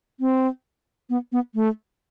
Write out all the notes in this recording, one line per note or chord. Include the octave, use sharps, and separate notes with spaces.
C4
B3
B3
A3